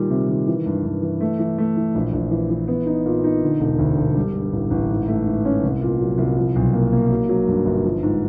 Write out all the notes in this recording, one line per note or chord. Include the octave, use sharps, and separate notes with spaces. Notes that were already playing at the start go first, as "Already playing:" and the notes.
Already playing: A#2 D#3 G3
C3
D#3
E3
G2
G2
E3
A3
E3
A3
E3
A#1
A#1
E3
E3
B3
D#4
A#2
D#4
D3
E1
D2
E1
G3
G2
A1
A1
G#2
A3
G#2
C#4
C2
A#2
F#3
C2
F3
B1
A#3
A#3
F#3
F#3
G2
G1
F3
G#2